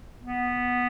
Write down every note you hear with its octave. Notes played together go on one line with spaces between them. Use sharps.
B3